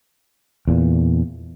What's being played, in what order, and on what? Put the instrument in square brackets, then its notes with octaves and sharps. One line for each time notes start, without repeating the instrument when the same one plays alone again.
[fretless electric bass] E2 A#2